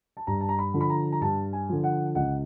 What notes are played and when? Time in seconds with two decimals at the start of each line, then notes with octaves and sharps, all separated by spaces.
0.17 A5
0.27 G2 A#5
0.41 A5
0.49 A#5
0.59 B5
0.74 D3 F3
0.81 B5
0.90 A#5
1.12 A#5
1.21 G2 A5
1.53 G#5
1.69 D3 F3
1.84 F#5
2.15 C#2 F#5